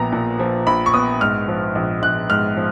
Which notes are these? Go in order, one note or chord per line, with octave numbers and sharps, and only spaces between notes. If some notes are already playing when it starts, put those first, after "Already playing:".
Already playing: A#1 A#2 F3 B3 A#5
A#2
F3
A#1 B5
C#6
B3 D#6
G#2 F6
F3
A#1
A#1 F#6
G#2 F6
F3